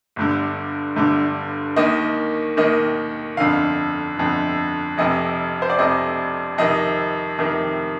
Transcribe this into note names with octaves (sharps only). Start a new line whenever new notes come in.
G1 G2 D3
G1 G2 D3
D#2 D#3 A#3 D#5
D#2 D#3 A#3 D#5
G1 F2 D3 F5
G1 F2 D3
F1 F2 C3 D#5
C5
D5
F1 F2 C3 D#5
F2 C3 D#3 D#5
F2 C3 D#3